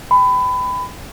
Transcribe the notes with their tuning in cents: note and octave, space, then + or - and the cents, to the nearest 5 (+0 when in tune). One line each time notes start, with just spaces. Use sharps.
G5 +30 B5 +25